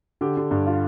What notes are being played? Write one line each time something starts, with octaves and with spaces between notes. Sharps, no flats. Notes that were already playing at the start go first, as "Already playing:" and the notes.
D3 G4
D3
G2
F4